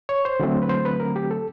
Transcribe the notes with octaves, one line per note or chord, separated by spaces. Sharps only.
C#5
C5
D3 F#3 A3 C4
B4
C5
B4
A#4
G4
A4